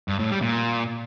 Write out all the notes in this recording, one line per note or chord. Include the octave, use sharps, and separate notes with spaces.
G2
A2
G3
A#2